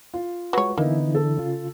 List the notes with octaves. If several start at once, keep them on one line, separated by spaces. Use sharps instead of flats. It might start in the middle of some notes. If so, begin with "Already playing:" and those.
F4
F#3 G#3 B4 C#5
D3 E3 A#3 B3 D#4 E4
A4
C#3 F4